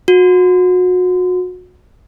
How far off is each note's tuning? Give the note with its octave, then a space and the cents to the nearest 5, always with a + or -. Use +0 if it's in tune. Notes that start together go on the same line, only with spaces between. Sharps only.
F#4 -30